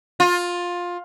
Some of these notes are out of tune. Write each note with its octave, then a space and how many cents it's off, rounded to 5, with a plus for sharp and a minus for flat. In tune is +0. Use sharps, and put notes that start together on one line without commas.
F4 +15